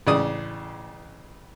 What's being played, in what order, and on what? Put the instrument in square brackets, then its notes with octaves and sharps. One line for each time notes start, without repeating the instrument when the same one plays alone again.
[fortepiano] A1 C#3 D5 D#6